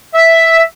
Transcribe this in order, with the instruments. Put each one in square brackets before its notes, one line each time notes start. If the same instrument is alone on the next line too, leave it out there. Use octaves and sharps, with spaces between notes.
[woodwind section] E5